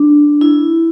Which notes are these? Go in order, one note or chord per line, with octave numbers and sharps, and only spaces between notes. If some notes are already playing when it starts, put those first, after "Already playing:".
Already playing: D4
E4